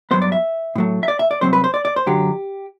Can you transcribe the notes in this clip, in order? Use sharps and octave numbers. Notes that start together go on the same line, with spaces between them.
G2 F#3 B3 C5
D5
E5
A2 F#3 A3
E5
D5
E5
D5
C2 B2 F#3 C4 C5
B4
C5
D5
D5
C5
F#2 D3 F#3 G4